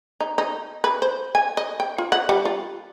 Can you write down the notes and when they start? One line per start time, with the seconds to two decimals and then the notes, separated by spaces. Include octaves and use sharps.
0.20 D#4
0.38 D#4
0.84 B4
1.02 C5
1.35 G#5
1.57 D#5
1.80 G5
1.98 F4
2.12 F#5
2.29 G3
2.45 F4